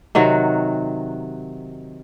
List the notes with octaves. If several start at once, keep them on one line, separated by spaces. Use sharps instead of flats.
C3 D#3 F#3 F#4